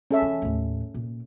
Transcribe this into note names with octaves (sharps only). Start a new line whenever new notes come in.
C#4 A4 E5
E3
D#2 A2
A#2